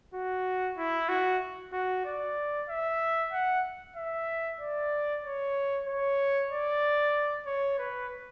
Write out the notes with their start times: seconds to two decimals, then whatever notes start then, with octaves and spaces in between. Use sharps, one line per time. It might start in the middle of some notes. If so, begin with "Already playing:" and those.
0.14 F#4
0.78 E4
1.09 F#4
1.73 F#4
2.05 D5
2.69 E5
3.32 F#5
3.96 E5
4.60 D5
5.24 C#5
5.87 C#5
6.51 D5
7.46 C#5
7.79 B4